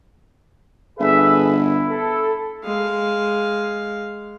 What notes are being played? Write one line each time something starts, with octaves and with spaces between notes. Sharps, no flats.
G1 G#4 A4 B4 E5
E4
A4
G#3 F5